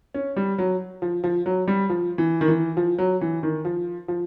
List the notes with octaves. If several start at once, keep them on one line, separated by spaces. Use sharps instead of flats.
C#4
G3
F#3
F3
F3
F#3
G3
F3
E3
D#3
E3
F3
F#3
E3
D#3
F3
F3